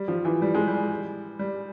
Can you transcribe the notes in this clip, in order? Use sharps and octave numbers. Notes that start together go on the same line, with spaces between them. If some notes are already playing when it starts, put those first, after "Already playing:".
Already playing: G3
F3
E3
G3
G#3
G3
G3